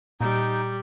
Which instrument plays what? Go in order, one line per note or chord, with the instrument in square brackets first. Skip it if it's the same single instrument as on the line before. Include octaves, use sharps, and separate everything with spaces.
[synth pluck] A#2 [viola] G3 [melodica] D#4